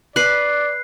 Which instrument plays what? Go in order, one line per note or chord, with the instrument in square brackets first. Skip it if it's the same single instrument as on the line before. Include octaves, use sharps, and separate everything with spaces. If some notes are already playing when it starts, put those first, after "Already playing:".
[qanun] B4 [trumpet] D5 [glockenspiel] F#6 C7